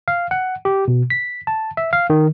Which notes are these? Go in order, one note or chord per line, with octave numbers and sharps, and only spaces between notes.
F5
F#5
G4
B2
B6
A5
E5
F5
D#3